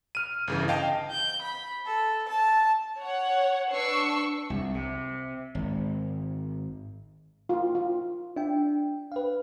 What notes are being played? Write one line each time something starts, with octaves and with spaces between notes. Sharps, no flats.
F6 D#7
G1 C#3 E3
D#5 F5 G5 A5
G6
B5
A4
A5
C#5 F#5
D4 B4 C#6 E6 C7
C2
C3
G#1
F4
F4
D4 E5 G5
B4 F5